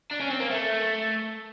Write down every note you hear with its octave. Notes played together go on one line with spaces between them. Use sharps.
D4
C#4
C4
A#3
A3